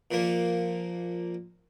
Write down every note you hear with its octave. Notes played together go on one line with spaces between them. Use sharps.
A#2 F3 A#3